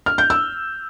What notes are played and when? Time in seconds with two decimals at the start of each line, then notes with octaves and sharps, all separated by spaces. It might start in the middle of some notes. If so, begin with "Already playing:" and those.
0.06 F6
0.18 G6
0.30 E6